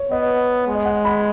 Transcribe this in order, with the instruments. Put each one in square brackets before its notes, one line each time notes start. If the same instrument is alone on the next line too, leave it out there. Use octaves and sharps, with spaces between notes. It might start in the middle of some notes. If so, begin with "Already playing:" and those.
Already playing: [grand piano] C#5
[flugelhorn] B3 [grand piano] D#5
[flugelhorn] G#3
[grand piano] D#5
F#5
B5